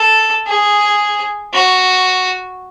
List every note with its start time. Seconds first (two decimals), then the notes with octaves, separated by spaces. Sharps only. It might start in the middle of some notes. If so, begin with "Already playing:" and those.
Already playing: A4
0.46 G#4
1.53 F#4